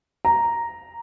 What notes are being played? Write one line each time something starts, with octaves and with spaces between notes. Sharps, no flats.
A#5